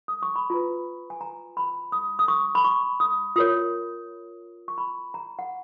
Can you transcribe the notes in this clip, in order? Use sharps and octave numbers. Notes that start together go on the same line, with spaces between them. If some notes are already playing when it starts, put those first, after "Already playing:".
D#6
C#6
B5
F4 B4 A#5
G#5
A#5
B5
D#6
D#6
C#6
B5
C#6
D#6
F4 A#4 C#5 D#6
C#6
B5
A#5
F#5